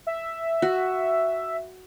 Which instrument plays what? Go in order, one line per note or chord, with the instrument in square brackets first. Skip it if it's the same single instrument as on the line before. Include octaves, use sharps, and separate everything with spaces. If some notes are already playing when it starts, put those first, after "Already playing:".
[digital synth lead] E5
[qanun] F#4